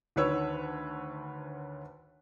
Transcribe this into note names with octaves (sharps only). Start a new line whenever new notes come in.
D2 D#3 B4 C#5 E6